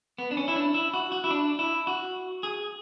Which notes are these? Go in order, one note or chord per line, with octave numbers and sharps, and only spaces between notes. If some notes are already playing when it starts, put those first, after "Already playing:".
B3
D4
C#4
E4
D4
E4
F#4
F#4
E4
D4
E4
F#4
G#4